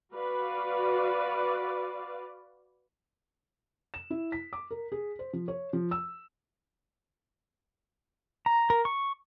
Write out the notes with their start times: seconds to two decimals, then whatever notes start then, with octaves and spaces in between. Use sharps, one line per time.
0.15 F#4 B4 D5 F5
3.94 E7
4.10 E4
4.32 B6
4.53 D6
4.71 A#4
4.92 G#4
5.19 C5
5.33 F3
5.48 C#5
5.73 F3
5.91 E6
8.46 A#5
8.70 A#4
8.85 C#6